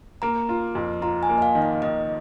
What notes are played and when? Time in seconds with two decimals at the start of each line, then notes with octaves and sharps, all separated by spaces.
0.22 A#3 A#5
0.49 F4
0.75 F2
1.02 F4 A#5
1.23 G#5
1.29 A#3
1.38 D#5
1.42 F5
1.55 D#3
1.62 D#5
1.82 D#3 D#5